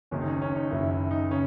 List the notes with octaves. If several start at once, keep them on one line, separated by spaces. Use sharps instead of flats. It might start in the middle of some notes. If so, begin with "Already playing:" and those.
F#1 F#2 D#3 C#4
D#4
C#4
C#4
D#4
F#1 F#2 D#3 E4
E4
D#4
C#3 C#4